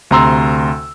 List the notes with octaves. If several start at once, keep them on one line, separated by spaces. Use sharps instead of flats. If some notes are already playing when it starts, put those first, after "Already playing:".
D2 C3 A#5 C6 E6